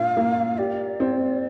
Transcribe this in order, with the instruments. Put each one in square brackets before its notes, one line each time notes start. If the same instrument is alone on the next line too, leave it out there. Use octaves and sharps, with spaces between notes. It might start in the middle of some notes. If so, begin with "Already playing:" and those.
Already playing: [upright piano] A#2 D4 [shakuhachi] F5
[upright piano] A#3
[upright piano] G4 [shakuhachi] D5
[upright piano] C4